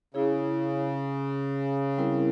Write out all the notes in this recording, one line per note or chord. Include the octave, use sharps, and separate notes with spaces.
C#3 E4 G#4 C#5
G3 C4 E4 A#4